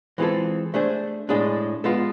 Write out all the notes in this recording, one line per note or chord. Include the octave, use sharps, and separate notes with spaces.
E3 G#3 C4 F4 A4
A3 D4 G#4 C5
A2 G#3 D4 G#4
G#3 B3 F4 A4